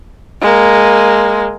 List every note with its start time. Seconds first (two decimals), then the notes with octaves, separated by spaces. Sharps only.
0.42 G#3 A#3